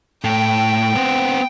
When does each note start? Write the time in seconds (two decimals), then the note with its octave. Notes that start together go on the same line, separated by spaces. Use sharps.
0.24 A2 G5
0.95 B3 C4